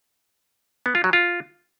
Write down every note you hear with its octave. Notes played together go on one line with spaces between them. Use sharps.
B3
F4
F#3
F4